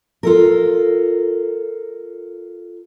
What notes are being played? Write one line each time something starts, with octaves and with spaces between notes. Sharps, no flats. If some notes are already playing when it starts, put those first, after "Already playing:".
F4 A4 A#4